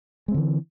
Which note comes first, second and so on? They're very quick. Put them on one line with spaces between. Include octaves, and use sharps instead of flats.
G#3 C4 D3 E3